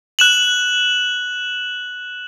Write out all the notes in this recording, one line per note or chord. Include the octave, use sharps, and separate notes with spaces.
F#6 E7 F#7